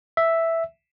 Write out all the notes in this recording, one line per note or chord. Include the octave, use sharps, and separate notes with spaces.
E5